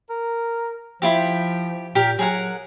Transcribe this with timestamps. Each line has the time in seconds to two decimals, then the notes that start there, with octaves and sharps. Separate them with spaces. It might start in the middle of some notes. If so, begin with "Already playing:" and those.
0.10 A#4
1.02 F3 E4 F4 G4
1.95 A#2 G4 A#4
2.19 F#3 G#4 A#4 F#5